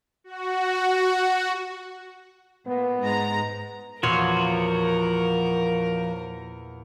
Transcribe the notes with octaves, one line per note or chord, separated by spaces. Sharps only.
F#4
A#2 B3
G#2 G#3 A#5
E2 A#2 F3 F#4 A#4 C#5 C6